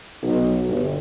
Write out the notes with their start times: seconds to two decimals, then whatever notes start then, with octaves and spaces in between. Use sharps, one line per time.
0.23 B1
0.68 G1